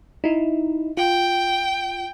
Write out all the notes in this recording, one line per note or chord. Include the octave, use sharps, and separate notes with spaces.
D#4 E4
F4 G5